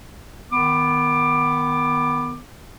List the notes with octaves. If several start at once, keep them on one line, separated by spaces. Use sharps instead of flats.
D#3 B3 D6